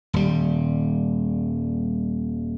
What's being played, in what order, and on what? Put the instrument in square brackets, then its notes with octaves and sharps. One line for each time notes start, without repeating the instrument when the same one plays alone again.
[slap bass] D#1 G3